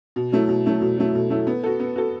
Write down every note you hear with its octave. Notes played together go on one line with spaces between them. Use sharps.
B2
F#3 A3 E4
B2
F#3 A3 E4
B2
F#3 A3 E4
B2
F#3 A3 E4
B3
F#4 A4
B3
F#4 A4